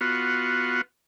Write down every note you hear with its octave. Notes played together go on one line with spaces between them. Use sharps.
B3 F4 F#4